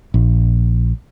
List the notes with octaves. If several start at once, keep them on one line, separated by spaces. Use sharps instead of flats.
A#1